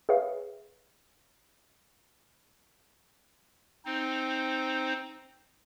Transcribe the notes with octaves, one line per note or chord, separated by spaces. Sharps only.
G#4 B4 C#5 E5 F5
C4 D#4 C5